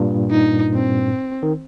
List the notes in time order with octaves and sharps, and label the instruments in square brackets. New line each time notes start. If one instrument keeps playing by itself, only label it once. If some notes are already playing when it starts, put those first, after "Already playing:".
Already playing: [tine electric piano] G2 A#2
[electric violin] D#4
C4
[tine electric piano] D#3